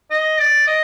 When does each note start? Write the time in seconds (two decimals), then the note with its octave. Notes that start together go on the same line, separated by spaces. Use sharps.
0.10 D#5
0.39 D5
0.67 D#5